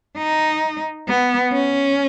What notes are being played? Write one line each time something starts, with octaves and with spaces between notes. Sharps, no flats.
D#4
B3
C#4